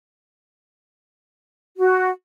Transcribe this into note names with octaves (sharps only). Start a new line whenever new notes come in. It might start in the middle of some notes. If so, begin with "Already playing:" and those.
F#4